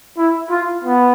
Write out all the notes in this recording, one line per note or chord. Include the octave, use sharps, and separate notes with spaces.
E4
F4
B3